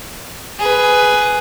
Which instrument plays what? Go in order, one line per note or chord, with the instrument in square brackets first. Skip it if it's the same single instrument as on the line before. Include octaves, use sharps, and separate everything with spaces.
[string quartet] G#4 B4